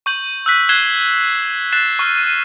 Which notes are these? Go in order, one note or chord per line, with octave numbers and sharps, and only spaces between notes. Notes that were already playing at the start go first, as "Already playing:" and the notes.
C#6 G6 F#7
E6 F#6 B6
F#6 G#6 C7 E7 G7
F#6 A6 C7 E7
C#6 F6 D#7